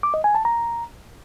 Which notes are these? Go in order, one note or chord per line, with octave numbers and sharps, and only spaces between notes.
D6
D#5
G#5
A5
A#5